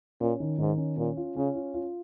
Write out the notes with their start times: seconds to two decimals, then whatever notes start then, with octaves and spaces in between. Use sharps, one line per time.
0.20 A#2 C#4
0.40 D#3
0.58 G#2 D#3
0.77 C#4
0.97 A#2 C#4
1.17 F4
1.36 C#3 C#4
1.55 F4
1.74 F4